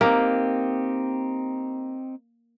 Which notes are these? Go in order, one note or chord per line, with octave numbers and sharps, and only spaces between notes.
A#3 C4 D#4 G4